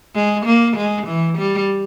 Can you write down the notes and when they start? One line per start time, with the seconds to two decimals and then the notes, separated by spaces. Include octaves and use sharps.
0.15 G#3
0.46 A#3
0.77 G#3
1.07 E3
1.38 G3